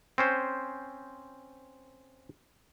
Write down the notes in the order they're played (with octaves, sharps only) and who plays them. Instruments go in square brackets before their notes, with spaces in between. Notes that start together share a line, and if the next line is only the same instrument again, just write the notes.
[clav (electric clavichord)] C4 C#4 C5